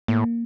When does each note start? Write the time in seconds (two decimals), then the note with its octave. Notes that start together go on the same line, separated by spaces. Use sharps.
0.08 A2 A#3